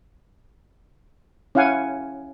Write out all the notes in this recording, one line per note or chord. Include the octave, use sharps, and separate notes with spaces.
C#4 E4 F5 F#5 G#5